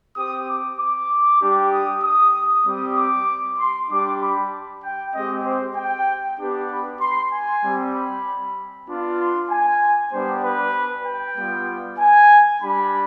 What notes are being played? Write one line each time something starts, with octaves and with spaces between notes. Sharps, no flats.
C4 G4 D#6
D6
D6
G3 D4 G4
D#6
D#6
G3 C4 G4 D#6
D6
C6
G3 D4 G4 D6
B5
G5
G#3 C4 G4 D#5
C5
G5
B3 D4 G4
B5
C6
G#5
G3 C4 G4
B5
B3 D4 F4
C6
G#5
G3 B3 D4 G4 C5
B4
G5
G3 B3 F4
G#5
G3 D4 G4 B5